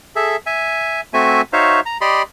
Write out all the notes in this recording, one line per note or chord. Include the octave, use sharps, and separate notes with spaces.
G#4 A4 E5
E5 G#5
A3 C4 F#4 E5 G#5
D#4 F#4 C5 C#5 E5 F5
A#5
G4 D5 D#5 B5 C6